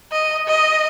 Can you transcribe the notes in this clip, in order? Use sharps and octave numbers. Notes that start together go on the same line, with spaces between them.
D#5
D#5